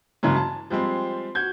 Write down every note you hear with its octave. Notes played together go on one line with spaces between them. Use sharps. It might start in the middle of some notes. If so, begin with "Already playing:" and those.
G2 C#3 E3 F#3 G#3
A5
F3 G3 G#3 C4
F#4 G6 G#6